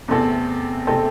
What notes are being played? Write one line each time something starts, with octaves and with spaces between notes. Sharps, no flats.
E2 C3 A3 C4 A4
C3 A3 C4 A4